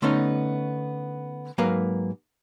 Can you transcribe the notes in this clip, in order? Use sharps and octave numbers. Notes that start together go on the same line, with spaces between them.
D3 A3 B3 C#4 D#4
G#2 F#3 A#3 A#4 B4 F5